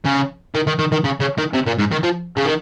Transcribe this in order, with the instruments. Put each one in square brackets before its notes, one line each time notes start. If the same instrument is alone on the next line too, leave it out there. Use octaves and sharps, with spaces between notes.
[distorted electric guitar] C#3
D#3
D#3
D#3
D#3
C#3
C#3
D#3
C3
A#2
G#2
D#3
F3
C#3
D#3